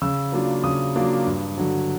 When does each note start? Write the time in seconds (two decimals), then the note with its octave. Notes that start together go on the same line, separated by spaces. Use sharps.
0.02 C#3 E6
0.32 F#3 A#3 D4 F4
0.64 C#3 D#6
0.95 F#3 A#3 D4 F4
1.27 G2
1.58 D3 F#3